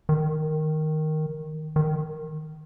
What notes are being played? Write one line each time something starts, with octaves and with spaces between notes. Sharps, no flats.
D#3
D#3